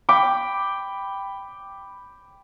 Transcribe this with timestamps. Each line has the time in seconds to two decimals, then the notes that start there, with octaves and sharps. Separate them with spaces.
0.09 G5 B5 D6